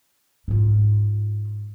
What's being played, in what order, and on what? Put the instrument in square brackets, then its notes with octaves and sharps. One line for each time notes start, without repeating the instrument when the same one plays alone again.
[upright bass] G#2 F4